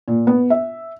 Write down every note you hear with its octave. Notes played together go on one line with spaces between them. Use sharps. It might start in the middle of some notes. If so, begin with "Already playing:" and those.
A#2
B3
E5